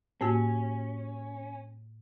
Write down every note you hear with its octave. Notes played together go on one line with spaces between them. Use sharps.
A2 A#3 C#4 F#4